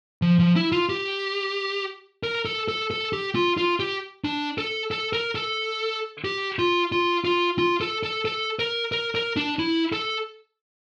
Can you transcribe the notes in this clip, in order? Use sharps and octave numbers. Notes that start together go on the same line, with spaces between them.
F3
F3
E4
F4
G4
A#4
A4
A4
A4
G4
F4
F4
G4
D4
A4
A4
A#4
A4
G4
F4
F4
F4
F4
A4
A4
A4
A#4
A#4
A#4
D4
E4
A4